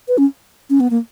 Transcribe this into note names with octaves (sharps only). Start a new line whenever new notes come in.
B4
C#4
C#4
B3
A#3